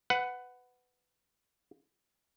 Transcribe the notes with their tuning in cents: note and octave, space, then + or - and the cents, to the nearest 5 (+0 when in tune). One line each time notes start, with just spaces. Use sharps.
B4 +15 F#5 +0